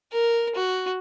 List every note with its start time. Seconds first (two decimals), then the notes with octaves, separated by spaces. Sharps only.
0.13 A#4
0.56 F#4